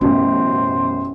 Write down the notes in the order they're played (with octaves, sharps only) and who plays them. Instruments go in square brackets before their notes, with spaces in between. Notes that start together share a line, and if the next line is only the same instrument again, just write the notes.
[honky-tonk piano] A1 F#2 B2 [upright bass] C#4 [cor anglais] C5